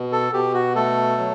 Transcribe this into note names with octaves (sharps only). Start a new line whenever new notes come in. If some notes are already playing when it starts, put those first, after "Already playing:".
Already playing: B2
A4
B2 G4
F#4
A3 A4
F#3